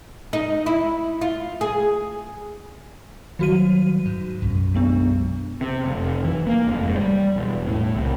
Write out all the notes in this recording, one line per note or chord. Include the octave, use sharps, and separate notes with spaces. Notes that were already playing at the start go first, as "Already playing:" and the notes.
D#4
E4
F4
G#4
D#3 F#3 G3 F#4 D#7
G#2
B1 F#2
G#3 B3 D4
C3
F1
E3
A#3
F1
G#2
G3
E1
A2
C2